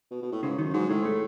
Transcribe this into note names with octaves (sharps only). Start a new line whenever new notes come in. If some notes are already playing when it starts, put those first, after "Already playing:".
B2
B2
A2
G#2 C#3
F#2 D#3
G#2 F#3
A2 G#3
A3